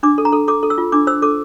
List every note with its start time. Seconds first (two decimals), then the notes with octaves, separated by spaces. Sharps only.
0.03 D4 D6
0.18 A4
0.25 A#5
0.32 A4
0.48 A4 D6
0.63 A4
0.70 E6
0.78 F4
0.92 D4 D6
1.07 C5 E6
1.22 A4 D6